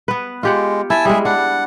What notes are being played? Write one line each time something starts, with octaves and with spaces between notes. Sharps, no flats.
B3 B4
G#3 F4 G4 F#5
E4 E5 G#5 A5 E6
G3 G#3 G#4 E5
D4 F#5